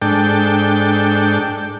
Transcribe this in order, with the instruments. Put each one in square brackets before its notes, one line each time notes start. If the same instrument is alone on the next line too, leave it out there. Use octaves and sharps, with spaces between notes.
[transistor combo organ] G#2 D4 A4 G5